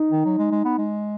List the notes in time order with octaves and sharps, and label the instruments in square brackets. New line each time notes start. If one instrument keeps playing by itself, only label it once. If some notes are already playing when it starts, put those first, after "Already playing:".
Already playing: [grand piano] D#4
[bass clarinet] D#3
F#3
G#3
G#3
B3
G#3